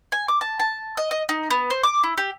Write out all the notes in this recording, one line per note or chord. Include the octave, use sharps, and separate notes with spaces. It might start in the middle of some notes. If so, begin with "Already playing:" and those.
G#5
D6
A5
A5
D#5
D#5
D#4
B3
C5
D6
E4
G4